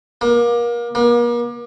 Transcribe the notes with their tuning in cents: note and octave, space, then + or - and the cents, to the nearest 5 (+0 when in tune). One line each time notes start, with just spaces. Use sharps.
A#3 +30
A#3 +40